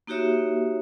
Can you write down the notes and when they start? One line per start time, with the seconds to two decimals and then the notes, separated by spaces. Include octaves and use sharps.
0.07 A#3 D#4 F#4 G4 C#5 E5